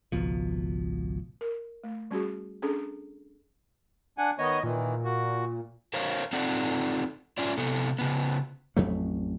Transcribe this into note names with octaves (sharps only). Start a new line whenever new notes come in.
G#1 C#2 B2 F3
A#4
A3
G3 C#4 F#4 G#4
C#4 D4 G#4 A4
D4 F#5 G#5
D#3 B3 C#5 D#5
A#2 D#3 E3
A#3 F#4
A#4 C5 C#5 F5
C4 D#4 F4 A4 D5 F#5
C#4 F4 D5
C3 B3 A4
C#3 B3
A1 F2 F#3 A3